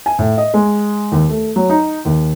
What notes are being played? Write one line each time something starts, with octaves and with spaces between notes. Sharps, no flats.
G#5
A2
D#5
G#3
D#2
A3
F#3
D#4
D#2